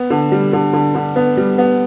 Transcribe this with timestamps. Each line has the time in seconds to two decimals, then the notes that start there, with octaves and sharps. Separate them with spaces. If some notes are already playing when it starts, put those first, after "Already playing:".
Already playing: B3
0.10 D3
0.32 G3
0.53 D3
0.73 D3
0.95 D3
1.16 B3
1.37 G3
1.58 B3